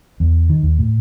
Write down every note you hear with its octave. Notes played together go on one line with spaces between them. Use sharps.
E2
D#3
D#2
A2